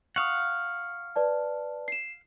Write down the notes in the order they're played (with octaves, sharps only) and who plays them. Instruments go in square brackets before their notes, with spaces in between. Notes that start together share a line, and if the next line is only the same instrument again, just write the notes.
[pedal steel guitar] F5 F#5 [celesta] C#6 D#6
[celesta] B4 D5 A5
C7 E7